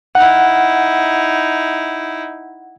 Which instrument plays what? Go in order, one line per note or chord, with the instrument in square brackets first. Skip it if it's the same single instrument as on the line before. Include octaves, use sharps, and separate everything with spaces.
[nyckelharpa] D#4 E4 [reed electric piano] F#5